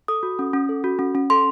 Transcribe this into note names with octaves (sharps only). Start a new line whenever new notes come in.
A4 D#6
F#4
C#4
C#4
A4
F#4
C#4
C#4
A4 C6